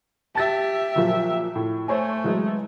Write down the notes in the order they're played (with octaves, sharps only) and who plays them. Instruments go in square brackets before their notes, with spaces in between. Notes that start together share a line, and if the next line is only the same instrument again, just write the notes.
[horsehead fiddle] G4 E5 [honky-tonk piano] A5 A6
[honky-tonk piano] A#2 F3 F#3
A2
[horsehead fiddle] A3 [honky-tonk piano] C5 C#5 G#5
[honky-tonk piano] E3 F#3 G#3